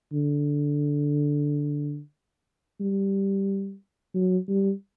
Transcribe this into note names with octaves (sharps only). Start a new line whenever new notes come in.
D3
G3
F#3
G3